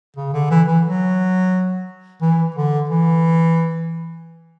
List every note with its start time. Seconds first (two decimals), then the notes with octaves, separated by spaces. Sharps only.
0.17 C#3
0.33 D3
0.50 E3
0.68 E3
0.85 F#3
2.22 E3
2.56 D3
2.89 E3